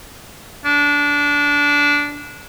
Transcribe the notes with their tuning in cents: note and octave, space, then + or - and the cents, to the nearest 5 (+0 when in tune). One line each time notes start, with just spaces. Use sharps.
D4 -20